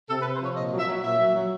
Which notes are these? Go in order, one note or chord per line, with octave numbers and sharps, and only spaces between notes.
C3 A4
B4
C3
C5
F3 C#5
A#2 D#5
F#3
E5
F#3
A#2 E5
F#3
F#3